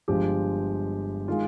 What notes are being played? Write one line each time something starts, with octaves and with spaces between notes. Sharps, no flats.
G1 G2 F3 G#3 G4
D#3 G#3 F4